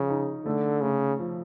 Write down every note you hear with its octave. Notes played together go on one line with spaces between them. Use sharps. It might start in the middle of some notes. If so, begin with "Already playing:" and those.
Already playing: C#3 F3
D#4
D3 A3
C#3 A3
F3